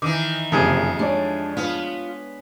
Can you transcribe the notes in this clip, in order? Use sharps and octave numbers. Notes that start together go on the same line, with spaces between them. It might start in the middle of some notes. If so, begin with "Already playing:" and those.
D#3 E3 D6
F#1 F2 C3 G#4
G#3 D4 C#5 D5
B3 F4